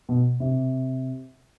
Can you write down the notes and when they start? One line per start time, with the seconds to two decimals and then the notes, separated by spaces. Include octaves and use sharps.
0.09 B2
0.40 C3